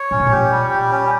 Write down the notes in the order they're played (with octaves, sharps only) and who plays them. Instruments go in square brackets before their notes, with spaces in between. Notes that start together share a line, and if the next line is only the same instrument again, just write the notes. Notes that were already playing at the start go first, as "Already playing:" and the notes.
Already playing: [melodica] C#5
[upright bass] A#2 [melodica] C#4
[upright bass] C3
[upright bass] A#2 [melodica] G4
[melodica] G3
G4
C#4